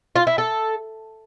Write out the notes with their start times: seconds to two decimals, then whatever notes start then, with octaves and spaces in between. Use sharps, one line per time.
0.16 F4
0.27 E4
0.38 A4